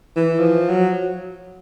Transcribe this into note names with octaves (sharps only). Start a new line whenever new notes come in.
E3
F3
F#3